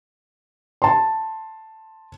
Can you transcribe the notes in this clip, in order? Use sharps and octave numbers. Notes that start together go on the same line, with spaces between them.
A5 C6